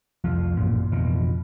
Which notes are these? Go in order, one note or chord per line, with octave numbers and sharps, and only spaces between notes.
C2 F2 F3
A1 F#2 A#2
A1 F2 B2 F3